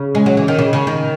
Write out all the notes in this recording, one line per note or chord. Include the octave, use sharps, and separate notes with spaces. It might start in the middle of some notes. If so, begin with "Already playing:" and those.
Already playing: C#3
G#3
F#3
E3
D#3
C#3
C#3
D#3